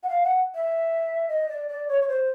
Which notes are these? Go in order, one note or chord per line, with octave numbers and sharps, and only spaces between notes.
F#5
F5
F#5
E5
D#5
D5
D5
C#5
C#5
C5